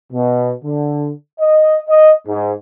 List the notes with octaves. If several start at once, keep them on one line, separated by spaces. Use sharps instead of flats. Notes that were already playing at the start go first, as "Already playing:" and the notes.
B2
D3
D#5
D#5
G#2